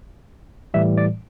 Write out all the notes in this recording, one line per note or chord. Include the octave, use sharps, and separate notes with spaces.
A2 E3 G3 E5
D5